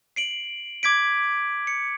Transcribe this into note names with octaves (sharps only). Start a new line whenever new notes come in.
C7 D7 F#7
D6 G#6 B6 D7
C#7